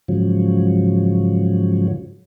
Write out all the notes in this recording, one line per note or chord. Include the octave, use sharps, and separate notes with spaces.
G#2 C#3 F3 F#3